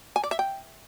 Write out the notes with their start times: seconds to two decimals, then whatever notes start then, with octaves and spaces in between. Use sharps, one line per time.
0.16 G#5
0.24 D5
0.31 E5
0.39 G5